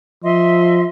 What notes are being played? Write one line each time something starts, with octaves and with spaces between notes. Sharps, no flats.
F3 D#5 E5 C6